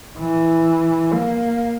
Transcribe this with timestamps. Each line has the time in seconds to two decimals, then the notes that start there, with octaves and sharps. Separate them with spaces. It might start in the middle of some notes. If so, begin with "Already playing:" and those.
0.19 E3
1.13 A#3